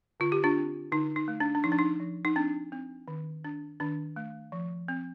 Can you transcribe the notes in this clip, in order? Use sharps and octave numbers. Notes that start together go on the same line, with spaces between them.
D3 F4
G4
D4 F4
C4
D3 D#4
D#4
A3
D4
D4
F3 D#4
D4
D#4
F3
D#4
C4 D4
C4
D#3
D4
D#3 D4
A3
F3
C4